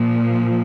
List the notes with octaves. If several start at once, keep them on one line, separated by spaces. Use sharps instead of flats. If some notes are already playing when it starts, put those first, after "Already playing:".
Already playing: A#2 F3